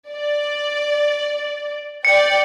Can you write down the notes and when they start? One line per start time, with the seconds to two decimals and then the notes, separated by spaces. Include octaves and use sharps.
0.11 D5
2.05 D5 G5 C#7